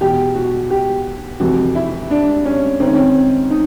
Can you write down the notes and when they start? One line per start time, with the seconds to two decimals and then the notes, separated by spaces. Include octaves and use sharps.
0.01 E2 B2 G4
0.35 F#4
0.70 G4
1.40 F2 C3 E3 F#4
1.75 E4
2.11 D4
2.45 C#4
2.80 G#2 D#3 C4
2.87 C#4
2.95 C4
3.50 D#4